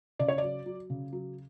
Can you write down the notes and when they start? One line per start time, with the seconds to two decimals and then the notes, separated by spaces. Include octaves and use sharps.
0.19 C#3 D5
0.28 C#5
0.38 F#3 D5
0.66 F#3
0.90 C#3
1.13 F#3